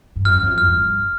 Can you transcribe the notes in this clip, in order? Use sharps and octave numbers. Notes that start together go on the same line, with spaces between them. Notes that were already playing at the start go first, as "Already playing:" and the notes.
G2
F#2 F6
F#2
F2
F6
G2